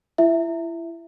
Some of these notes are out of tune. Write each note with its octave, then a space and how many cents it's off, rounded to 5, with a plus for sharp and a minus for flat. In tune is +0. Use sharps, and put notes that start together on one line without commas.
E4 +30 E5 +0